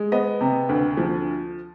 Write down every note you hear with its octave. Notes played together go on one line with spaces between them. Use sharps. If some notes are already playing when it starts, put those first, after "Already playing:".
Already playing: G#3
B3 D#5
C3
D2
F3